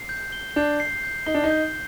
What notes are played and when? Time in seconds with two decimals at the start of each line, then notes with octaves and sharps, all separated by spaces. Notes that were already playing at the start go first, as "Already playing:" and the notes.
Already playing: C7
0.09 G6
0.32 G7
0.56 D4 G6
0.80 C7
1.03 G6
1.26 D#4 G7
1.35 D4
1.44 D#4
1.51 G6